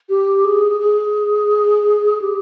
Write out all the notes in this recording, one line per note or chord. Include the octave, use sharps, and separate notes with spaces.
G4
G#4
G#4
G4